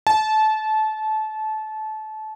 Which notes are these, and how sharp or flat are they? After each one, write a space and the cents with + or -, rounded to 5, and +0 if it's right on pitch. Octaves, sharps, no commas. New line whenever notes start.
A5 -25